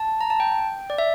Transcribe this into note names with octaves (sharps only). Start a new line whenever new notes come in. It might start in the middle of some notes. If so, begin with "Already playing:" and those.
Already playing: A5
A#5
A5
G5
D5
E5